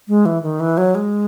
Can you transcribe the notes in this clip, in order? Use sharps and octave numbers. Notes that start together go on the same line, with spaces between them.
G#3
E3
D#3
E3
F#3
G#3